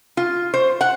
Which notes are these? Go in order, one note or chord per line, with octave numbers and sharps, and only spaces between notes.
F4
C5
F#5